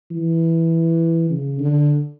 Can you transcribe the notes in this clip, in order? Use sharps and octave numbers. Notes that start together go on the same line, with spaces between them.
E3
C#3
D3